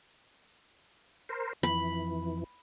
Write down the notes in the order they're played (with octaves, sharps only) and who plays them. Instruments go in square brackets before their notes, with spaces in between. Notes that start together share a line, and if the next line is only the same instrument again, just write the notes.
[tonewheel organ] A#4 C5
[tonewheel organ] F2 E3 [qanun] B5